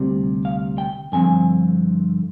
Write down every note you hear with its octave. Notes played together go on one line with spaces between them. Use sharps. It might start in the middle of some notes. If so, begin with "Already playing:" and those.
Already playing: D2 C3 G3 C4
F5
G5
G2 D3 F3 C4 G#5